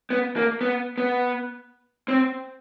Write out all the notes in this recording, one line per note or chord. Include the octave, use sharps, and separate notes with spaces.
B3
A#3
B3
B3
C4